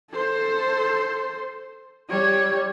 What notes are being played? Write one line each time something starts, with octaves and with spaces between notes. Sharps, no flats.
A4 C5
G3 C#5